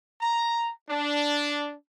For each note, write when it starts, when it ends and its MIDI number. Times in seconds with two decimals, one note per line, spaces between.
0.21 0.71 82
0.90 1.74 62